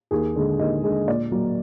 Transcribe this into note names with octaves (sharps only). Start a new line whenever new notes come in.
D#2 G#4
D3 G#3
D#2 D#5
D3 G#3
A#2 D5
F#3 A#3